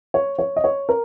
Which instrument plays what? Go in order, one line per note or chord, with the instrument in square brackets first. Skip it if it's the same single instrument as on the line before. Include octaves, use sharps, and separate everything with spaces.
[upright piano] C#5
C#5
D#5
C#5
A#4